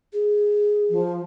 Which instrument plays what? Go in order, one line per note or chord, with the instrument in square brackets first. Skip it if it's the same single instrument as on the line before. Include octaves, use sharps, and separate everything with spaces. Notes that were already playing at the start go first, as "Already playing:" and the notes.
[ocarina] G#4
[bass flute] F3